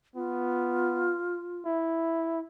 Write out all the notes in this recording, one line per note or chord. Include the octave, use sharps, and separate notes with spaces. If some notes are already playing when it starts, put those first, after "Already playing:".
B3 F4
E4